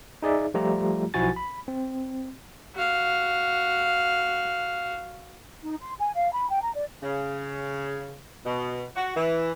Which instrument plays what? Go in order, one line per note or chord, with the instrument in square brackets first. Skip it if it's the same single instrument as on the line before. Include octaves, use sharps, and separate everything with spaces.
[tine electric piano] D#4 G#4 D5 E5
F3 G3 A3 F4 G4 A#5
B1 F3 E4 F#4 G#5 A6
B5
C4
[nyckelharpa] F#4 F5
[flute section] D#4
C6
G#5
F5
B5
G5
A#5
D5
[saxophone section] C#3
B2
F#4
E3